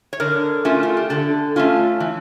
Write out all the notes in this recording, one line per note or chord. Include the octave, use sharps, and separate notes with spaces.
C#5
D3 A#4
A3 C#4 F4
F4
G4
D3 A4
A3 C#4 F4
E3